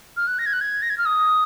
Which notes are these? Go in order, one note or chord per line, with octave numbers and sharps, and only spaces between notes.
F6
F#6
A#6
G#6
F#6
G#6
A#6
G#6
F6
D#6